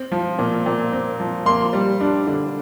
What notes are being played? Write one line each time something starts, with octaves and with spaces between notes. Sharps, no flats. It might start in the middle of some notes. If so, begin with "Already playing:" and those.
Already playing: C4
F3
A#2
A#2
C4
F3
A#3 C6
G3
D4
D3